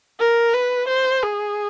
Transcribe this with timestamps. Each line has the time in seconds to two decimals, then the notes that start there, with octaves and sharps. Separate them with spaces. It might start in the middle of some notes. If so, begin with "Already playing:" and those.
0.19 A#4
0.54 B4
0.88 C5
1.22 G#4